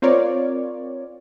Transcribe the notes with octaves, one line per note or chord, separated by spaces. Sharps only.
C4 F4 A#4 C#5 D5